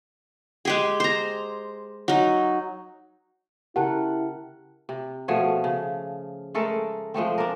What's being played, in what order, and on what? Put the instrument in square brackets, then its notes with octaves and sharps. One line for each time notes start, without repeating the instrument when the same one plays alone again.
[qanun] G#3 G4 G#4
C5 A#5
F#3 D#4
[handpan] C#3 A#4 F#5 [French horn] E4 [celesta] G4 G5 A5
[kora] C3
B2 F3 A3 G#4
C#3
G#3 A3 A4 A#4
F3 G#3 A3 C4
D4 A#4